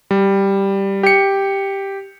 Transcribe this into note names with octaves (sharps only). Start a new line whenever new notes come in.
G3
G4 C#7